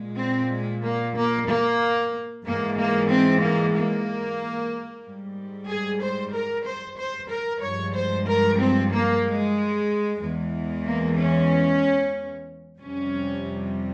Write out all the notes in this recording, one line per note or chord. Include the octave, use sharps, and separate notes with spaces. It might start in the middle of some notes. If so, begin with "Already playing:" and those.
Already playing: A#2 G#3
C4
G#3
A#3
A#3
A#3
G#2 E3 G#3 A#3
A#3
C4
A#3
A#3
G#2 G3
G#4
C5
A#4
C5
C5
A#4
G2 F3 G#3 C#5
C5
A#4
C4
A#3
G#3
E2 E3 G#3
A#3
C#4
F2 C3 G3 C#4